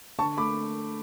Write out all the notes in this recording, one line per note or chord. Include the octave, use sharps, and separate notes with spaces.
D3 A5 C#6
A3 B5 D6